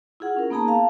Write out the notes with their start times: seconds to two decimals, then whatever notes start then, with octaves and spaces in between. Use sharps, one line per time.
0.20 E4 F4 G#4 F#5
0.37 C#4 A#4
0.50 A#3 B3 D#4 G#4 A5 A#5
0.68 F5 A5